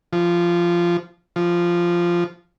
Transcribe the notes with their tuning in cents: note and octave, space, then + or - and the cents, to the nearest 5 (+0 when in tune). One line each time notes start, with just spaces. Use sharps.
F3 -15
F3 -10